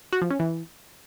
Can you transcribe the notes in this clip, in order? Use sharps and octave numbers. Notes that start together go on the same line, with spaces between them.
F#4
F3
C#4
E3